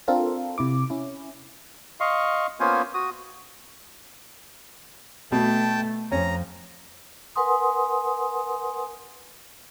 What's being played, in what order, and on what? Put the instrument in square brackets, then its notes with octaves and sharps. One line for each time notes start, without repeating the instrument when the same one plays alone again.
[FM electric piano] C4 D4 F4 A4 A#4
C3 E4 D6
C#4 E4
[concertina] D#5 F5 C6 C#6
A#3 B3 C#4 F4 C5 G#5
F#4 D#6
[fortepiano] B2 [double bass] A3 [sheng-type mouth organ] G5 A5
[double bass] F2 [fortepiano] C#4 [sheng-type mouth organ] A#5
[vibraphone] A#4 B4 F#5 G#5 C6 D#6